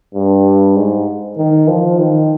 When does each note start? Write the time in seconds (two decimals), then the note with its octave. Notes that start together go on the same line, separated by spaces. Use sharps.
0.14 G2
0.76 G#2
1.37 D#3
1.68 F3
1.99 D#3